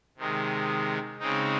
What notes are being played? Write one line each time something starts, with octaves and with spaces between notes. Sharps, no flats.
C3 D#3 G#3
C#3 G#3 C4 D#4